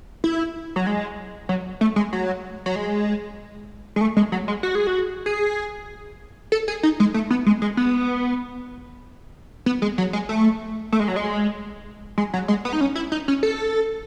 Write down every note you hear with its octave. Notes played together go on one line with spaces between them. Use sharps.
E4
F#3
G#3
F#3
A3
G#3
F#3
F#3
G#3
G#3
A3
G#3
F#3
G#3
F#4
G#4
F#4
G#4
A4
G#4
D#4
G#3
A3
B3
G#3
G#3
B3
B3
G#3
F#3
G#3
A3
A3
G#3
F#3
G#3
G#3
F#3
G#3
B3
D#4
C#4
E4
D#4
C#4
A4